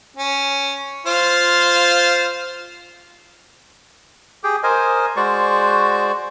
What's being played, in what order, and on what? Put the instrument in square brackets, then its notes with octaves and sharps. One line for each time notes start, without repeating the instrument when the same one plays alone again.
[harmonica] C#4
F4 C5
[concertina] G4 G#4 G5
A#4 C5 D#5 G#5
G#3 F#4 C5 D5 C#6